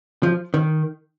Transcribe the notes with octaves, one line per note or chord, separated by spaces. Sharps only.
F3
D#3